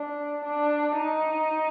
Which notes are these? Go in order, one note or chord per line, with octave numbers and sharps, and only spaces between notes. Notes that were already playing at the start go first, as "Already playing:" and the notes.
Already playing: D4
D4
D#4